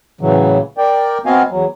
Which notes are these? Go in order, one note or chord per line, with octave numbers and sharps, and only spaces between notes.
A2 C#3 E3 F#3
A#4 D5 G5
B3 C4 F#4 D#5 F5 G#5
E2 F#3